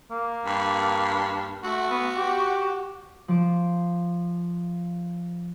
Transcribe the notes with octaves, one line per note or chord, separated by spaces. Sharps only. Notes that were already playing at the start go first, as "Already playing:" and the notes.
A#3
G2
A3 F#4
B3
G4
F3 D6